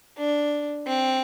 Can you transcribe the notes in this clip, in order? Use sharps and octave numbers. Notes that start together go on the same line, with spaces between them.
D4
C4